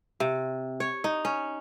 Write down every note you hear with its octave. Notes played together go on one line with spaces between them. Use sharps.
C3
C#5
D#4
C#4